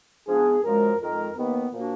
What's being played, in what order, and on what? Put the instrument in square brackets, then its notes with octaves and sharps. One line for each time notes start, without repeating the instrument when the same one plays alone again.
[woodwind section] G#2 F3 B3 D4 [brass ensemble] G#4
[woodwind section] F#2 F3 G#3 [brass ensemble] A#4
[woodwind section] F2 D#3 G#3 [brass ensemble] A#4
[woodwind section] D#2 D#3 A#3 [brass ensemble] B3
[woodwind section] A#2 F3 A#3 D4 F#4